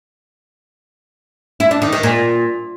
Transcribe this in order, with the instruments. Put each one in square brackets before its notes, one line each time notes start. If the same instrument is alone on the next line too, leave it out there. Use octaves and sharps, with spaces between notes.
[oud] E4
D4
D#3
D#3
A#2